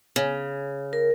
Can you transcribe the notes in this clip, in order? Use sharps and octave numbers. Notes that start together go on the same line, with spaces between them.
C#3
A#4